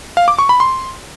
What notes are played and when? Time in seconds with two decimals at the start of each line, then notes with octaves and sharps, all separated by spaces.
0.17 F5
0.28 D6
0.39 C#6
0.49 B5
0.60 C6